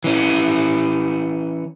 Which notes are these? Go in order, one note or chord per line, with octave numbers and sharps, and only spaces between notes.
E3 C#4